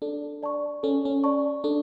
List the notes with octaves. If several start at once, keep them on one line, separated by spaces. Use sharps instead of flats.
D4 A4
D5 A5 C#6
C#4 A4
C#4
D5 A5 C#6
D4 A4